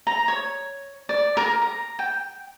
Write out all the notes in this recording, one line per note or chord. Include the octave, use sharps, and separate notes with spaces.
A#5
C#5
D5
A#4
A#5
G5